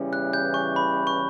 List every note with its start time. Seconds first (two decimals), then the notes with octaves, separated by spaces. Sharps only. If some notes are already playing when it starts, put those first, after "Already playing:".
Already playing: E2 C#3 E3 G3 C#4
0.13 F#6
0.33 G6
0.54 C#6
0.76 B5
1.07 C#6